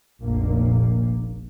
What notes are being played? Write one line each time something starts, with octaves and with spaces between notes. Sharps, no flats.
F1 A#1 A#3